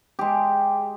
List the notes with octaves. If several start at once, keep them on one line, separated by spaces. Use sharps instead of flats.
G#3 G4